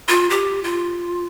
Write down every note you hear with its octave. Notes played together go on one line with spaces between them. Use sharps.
F4
G4
F4